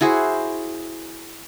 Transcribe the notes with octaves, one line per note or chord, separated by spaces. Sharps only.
E4 F#4 G#4 C5